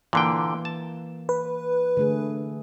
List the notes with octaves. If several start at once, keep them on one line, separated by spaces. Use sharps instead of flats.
A#2 D3 E3 A#3 G5
A5
B4
D3 A3 G#4